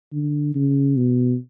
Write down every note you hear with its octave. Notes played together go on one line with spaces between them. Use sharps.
D3
C#3
B2